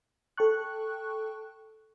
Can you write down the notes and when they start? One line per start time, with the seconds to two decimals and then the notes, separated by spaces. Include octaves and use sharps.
0.37 A4 G5 A5 C#6 F#6